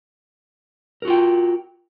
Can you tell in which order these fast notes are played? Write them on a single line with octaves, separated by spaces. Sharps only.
A#4 F#4 F4 G5